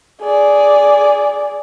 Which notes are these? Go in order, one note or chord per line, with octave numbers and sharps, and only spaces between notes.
G#4 D5